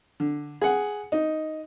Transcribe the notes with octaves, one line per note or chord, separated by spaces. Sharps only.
D3
G#4 F#5
D#4